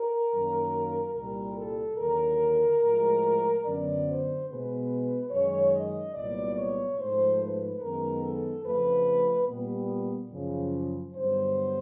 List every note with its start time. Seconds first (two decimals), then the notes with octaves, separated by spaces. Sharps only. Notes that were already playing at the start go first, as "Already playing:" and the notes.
Already playing: A#4
0.31 F#2 D#3 F#3 A#3
1.15 C2 A#2 G3 A#4
1.56 A4
1.98 D#2 D3 F#3 A#4
2.81 A2 F3 G#3
3.65 F#2 D3 F#3 B3 D5
4.06 C5
4.48 B2 G#3 B3 B4
5.31 F#2 D#3 G#3 C#5
5.73 D#5
6.15 C2 A#2 F#3 B3 D5
6.56 C#5
6.98 G#2 F3 A3 C5
7.40 B4
7.81 F#2 D#3 G#3 B3 A#4
8.23 A4
8.65 F2 C#3 F3 A3 B4
9.48 A#2 G3 B3
10.32 F#2 C#3 F3
11.14 G2 D3 F#3 B3 C5